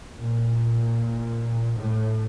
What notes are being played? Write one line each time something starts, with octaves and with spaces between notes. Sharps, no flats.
A#2
A2